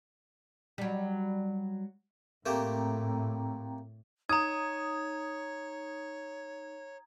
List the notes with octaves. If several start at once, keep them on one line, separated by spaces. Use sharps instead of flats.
F#3 G3
A2 A3 A#3 C4 G4 G5 A#5
D#4 C#5 A#5 D#6 G#6